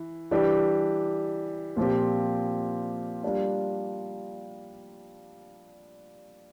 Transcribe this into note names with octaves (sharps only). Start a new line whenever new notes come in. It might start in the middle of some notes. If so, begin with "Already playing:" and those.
Already playing: E3 E4
E3 G3 D4 G4
A#2 F3 C4 G4
G3 A#3 D4 F4